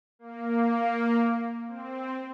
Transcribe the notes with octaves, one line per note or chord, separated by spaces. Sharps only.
A#3
C4